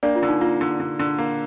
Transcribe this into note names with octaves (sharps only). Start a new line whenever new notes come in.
A#3 D4 D5
F4
D3
D#4
A#3 F4
D3
D3
D3
A#3